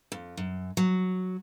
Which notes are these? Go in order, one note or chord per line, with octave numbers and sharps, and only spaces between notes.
F2
F#2
F#3